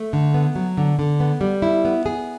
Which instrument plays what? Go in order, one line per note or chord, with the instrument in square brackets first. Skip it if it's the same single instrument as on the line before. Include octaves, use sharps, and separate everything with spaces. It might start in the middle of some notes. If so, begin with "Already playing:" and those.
Already playing: [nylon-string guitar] A3
D3
B3
F#3
D3
D3
B3
G3
E4
B3
G#4